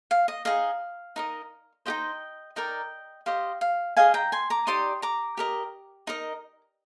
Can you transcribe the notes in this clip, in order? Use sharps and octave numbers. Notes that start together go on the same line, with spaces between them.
F5
D#5
D#4 G#4 D#5 F5
D#4 A#4 D#5
D#4 G4 C5 D#5 G5
D#4 A#4 D5 D#5 G5
G4 C5 D#5 F5
F5
G#4 D#5 F5 G#5
G5 A#5
G#5 C6
A#5 D6
D#4 G4 D5 C6 D#6
A#5 D6
G4 A#4 D#5
D#4 A#4 D#5